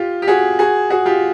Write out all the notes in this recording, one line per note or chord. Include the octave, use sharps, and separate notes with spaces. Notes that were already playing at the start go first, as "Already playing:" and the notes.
Already playing: F4 G4
G4
F#4 G#4
F#4 G#4
F#4 G#4
F4 G4